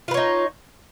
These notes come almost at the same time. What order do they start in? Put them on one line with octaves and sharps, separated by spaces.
F4 B4 C#5 D#4